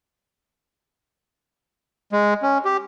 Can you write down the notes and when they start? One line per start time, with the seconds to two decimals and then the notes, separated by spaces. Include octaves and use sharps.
2.12 G#3
2.43 C#4
2.65 G4